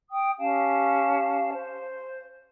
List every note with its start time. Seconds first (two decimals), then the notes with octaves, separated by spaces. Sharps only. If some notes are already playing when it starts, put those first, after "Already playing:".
0.10 G5 D#6
0.38 C#4 G4 F5 A5
1.53 C5